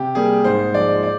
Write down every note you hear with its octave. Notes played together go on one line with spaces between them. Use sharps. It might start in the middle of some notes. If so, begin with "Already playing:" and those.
Already playing: C3 G4
G3 A#3 G#4
G#2 C5
F3 G#3 D5
D5